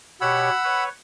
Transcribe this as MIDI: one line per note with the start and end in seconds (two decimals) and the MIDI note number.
0.21 0.50 47
0.21 0.50 67
0.21 0.50 73
0.21 0.84 78
0.21 0.84 83
0.21 0.84 88
0.64 0.89 71
0.64 0.89 73